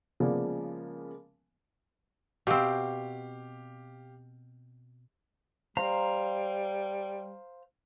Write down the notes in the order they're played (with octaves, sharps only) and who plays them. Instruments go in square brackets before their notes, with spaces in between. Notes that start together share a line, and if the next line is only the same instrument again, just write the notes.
[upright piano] C#3 F3 G#3 A#3 B3 D4
[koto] B2 C4 [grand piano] G4 F5
[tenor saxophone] G3 [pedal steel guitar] C5 F5 A#5